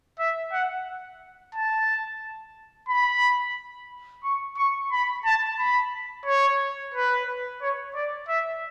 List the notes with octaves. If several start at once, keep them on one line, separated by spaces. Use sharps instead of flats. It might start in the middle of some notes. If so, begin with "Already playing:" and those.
E5
F#5
A5
B5
C#6
C#6
B5
A5
B5
C#5
B4
C#5
D5
E5